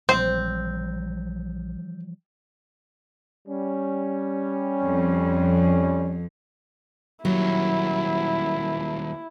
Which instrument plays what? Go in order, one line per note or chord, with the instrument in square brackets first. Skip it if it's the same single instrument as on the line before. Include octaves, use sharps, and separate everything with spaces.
[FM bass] A#1 [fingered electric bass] E3 F3 G3 [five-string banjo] C4 [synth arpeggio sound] C5
[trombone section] G3 C#4
[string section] F2
[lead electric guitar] D#2 G3 [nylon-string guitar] F#3 [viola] E4